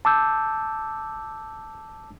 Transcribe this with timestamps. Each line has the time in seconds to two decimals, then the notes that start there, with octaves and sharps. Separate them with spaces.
0.05 A5 D6 E6 G6